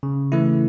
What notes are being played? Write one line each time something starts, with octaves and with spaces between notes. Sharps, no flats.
C#3
E3 A3 E4